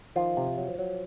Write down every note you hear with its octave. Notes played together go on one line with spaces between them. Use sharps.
D#3 F3 F4
C3
F#3
F#3